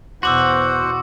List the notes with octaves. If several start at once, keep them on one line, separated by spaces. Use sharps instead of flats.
E2 B2 F#4 C5 F#5 C6 D6 E6